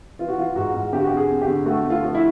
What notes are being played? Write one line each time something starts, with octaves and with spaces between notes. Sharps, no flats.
E3 F4
F#4
E3 F4
G#2 F#4
G#2
D3 G4
F#4
G4
F2
G#4
F2
G4
D3
A3 F#4
A3
F4
F3
E4